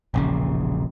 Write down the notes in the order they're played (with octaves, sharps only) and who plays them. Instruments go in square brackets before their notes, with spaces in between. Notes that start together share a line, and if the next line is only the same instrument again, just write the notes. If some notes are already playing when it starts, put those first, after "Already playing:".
[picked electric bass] E1 A#1 C#3